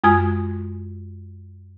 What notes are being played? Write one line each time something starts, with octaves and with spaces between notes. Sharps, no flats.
F#2 G#3 F4 G#5 D#6 G#6